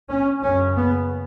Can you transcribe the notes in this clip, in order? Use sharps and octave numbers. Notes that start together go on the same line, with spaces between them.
C#4
F#2 C#3 C#4
B3